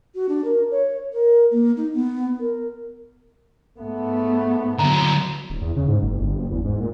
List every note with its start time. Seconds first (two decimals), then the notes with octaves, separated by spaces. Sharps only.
0.15 F#4
0.28 D4
0.44 A#4
0.71 C#5
1.13 A#4
1.51 A#3
1.76 D#4
1.93 B3
2.39 A#4
3.78 G#2 A3 B3
4.79 D3 F#3 A#5
5.50 D1
5.61 E2
5.76 C#3
5.88 G#2
6.03 F#1
6.20 G1
6.38 F#1
6.51 E2
6.65 G#2
6.80 A#2